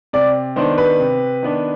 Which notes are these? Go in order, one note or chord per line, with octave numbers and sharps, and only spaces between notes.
C3 D5
D#3 B3 D4 C5
B4
C3
D#3 B3 D4